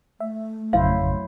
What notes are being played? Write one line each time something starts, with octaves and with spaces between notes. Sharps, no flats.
A3 E5
G#1 F2 C#3 F#3 E4 C5 F5